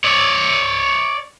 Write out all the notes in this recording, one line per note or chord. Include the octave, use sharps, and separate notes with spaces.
C#5 D5